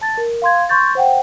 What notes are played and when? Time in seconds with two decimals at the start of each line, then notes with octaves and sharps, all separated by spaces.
0.01 A5 A6
0.18 A#4
0.42 F5 C6 G#6
0.69 C6 C#6 G6 A6
0.95 C5 F#5 G5